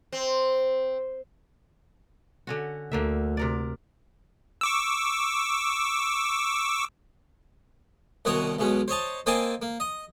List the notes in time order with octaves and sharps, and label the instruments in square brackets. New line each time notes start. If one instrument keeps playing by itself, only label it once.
[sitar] C4
[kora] D3 C#4 F#4
[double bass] D2 [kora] D3 A#3 E5
[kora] C3 A#4 D5
[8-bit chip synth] C#6 D6 E6
[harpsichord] C2 B2 D#3 F#4 C#5 D#6
B1 B2 G#3 C#4
C5 C#5 D#5 A5
A#3 C4 C5 D#5 G#5 A5
A#3
D#5